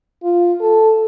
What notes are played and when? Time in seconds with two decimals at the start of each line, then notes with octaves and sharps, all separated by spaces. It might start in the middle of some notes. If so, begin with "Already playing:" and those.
0.23 F4
0.61 A4